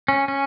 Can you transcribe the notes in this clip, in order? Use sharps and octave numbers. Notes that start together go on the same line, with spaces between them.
C#4
C#4